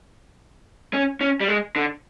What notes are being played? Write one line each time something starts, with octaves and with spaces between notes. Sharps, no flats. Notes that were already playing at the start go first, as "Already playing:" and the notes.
C#4
C#4
G3
G#3
D3